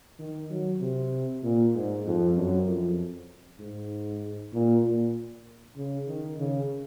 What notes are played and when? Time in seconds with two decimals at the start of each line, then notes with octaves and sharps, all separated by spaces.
0.19 D#3
0.50 F#3
0.81 C3
1.43 A#2
1.74 G#2
2.05 F2
2.36 F#2
2.67 F2
3.60 G#2
4.54 A#2
4.84 A#2
5.77 C#3
6.07 D#3
6.38 C#3